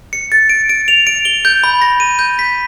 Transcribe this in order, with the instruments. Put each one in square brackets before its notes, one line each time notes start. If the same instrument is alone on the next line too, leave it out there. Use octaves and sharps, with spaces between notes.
[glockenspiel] C#7
A6
D7
D7
F7
D7
G7
G6
B5
A#6
D#7
G6
B6